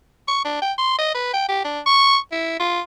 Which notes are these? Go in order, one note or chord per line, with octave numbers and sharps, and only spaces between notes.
C#6
D4
G5
C6
D#5
B4
G5
G4
D4
C#6
E4
F4